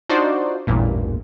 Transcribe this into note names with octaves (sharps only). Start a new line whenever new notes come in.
D4 D#4 F4 F#4 C5 D5
A1 E2 G2 A#2